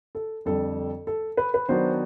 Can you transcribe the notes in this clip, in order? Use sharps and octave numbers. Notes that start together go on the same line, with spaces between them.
A4
F2 D3 G3 A4
A4
B4
B4
D#3 F#3 B3 D4 F#4 C5